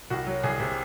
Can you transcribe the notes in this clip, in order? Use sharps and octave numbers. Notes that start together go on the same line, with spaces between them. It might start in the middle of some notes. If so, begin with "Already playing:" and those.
C2 F#4
F#3
C2 G#4
C3